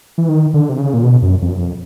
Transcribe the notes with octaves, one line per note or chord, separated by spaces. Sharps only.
E3
D#3
D3
C3
C#3
A#2
B2
F#2
F2
F#2
F2